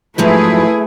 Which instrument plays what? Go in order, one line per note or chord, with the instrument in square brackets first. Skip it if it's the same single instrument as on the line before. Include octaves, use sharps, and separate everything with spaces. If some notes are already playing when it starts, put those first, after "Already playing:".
[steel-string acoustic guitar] G#2 F3 F#3 [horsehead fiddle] A3 [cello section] E4 G#4 B4